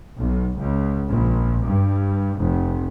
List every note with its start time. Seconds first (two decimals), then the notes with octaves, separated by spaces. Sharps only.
0.16 B1
0.60 C#2
1.09 A#1
1.66 G2
2.39 F1